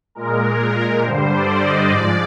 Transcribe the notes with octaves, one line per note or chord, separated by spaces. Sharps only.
A#2 G#3 A#4
G2 D3 G3 C5
D5
D#5
G#2 F3 G#3 D5